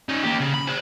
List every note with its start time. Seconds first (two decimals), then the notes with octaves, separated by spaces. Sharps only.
0.09 C#4 D#4
0.23 A#3 G4
0.40 C#3
0.54 B5
0.67 A#4 C5